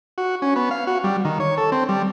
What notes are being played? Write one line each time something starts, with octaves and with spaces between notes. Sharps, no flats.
F#4
C#4
B3
F5
F#4
G3
D#3
C#5
A4
C4
G3